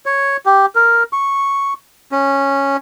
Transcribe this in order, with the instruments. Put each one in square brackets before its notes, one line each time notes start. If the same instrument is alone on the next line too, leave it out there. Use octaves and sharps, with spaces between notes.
[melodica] C#5
G4
A#4
C#6
C#4